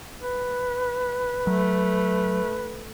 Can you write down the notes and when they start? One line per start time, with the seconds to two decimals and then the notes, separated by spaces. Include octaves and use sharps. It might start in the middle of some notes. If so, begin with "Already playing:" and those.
0.21 B4
1.47 F#3 A3